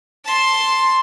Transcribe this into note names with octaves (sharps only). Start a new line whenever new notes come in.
A5 C6